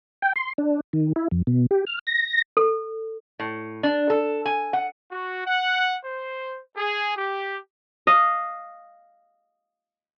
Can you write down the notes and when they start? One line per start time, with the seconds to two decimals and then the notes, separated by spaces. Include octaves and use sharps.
0.22 G5
0.36 C6
0.58 D4
0.93 D#3
1.16 E4
1.31 F2
1.47 B2
1.71 G4
1.86 F6
2.07 A#6
2.57 A4
3.40 A2
3.83 D4
4.10 A4
4.46 G#5
4.73 F#5
5.12 F#4
5.45 F#5
6.04 C5
6.77 G#4
7.16 G4
8.07 D#5 F5